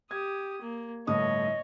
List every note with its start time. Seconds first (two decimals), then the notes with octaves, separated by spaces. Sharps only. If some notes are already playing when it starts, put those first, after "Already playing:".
0.11 G4 D#6 G#6
0.62 A#3
1.07 G1 A2 C#5 D#5 D#6